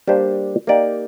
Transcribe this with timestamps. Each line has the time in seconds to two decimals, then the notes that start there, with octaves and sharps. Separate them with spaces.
0.07 G3 A#3 D4 G4 C5
0.67 A#3 D#4 G4 D5